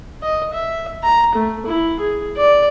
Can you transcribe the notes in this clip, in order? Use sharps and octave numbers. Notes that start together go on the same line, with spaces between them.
D#5
E5
A#5
A3
E4
G#4
D5